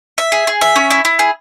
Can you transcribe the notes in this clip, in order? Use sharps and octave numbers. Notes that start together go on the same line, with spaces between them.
E5
G#4
G#4
E5
C#4
E4
E4
G#4